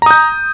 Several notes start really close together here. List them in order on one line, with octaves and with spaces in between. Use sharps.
A#5 D#6 G6